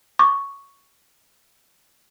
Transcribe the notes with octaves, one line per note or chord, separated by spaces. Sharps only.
C#6 D6